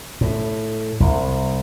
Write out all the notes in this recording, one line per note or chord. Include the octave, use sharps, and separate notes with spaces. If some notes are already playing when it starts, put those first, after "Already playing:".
A2
C2